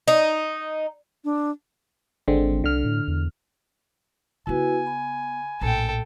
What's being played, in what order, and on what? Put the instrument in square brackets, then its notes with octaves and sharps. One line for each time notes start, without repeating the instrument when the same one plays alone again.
[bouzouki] D#4
[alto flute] D4
[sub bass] G#1 [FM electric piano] D3 G#3 C4
[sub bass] C2 [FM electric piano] D3 F6
[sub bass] A2
E2
[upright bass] C#3 B3 [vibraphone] E4 F#4 B4 [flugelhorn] G#5
[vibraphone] B5
[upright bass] A#1 A2 [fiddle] A4 G5